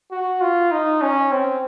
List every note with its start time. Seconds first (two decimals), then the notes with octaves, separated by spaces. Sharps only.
0.11 F#4
0.41 F4
0.72 D#4
1.02 C#4
1.32 C4